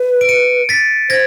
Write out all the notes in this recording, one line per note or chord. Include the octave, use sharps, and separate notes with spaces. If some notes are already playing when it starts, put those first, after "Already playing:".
Already playing: B4
D7
C#7 D#7
A6 B6
C5 G#6 A#6